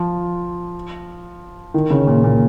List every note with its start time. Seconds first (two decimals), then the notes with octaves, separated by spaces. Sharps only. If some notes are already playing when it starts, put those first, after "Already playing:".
Already playing: F3
1.74 D#3
1.90 C#3
2.07 A#2
2.24 A#2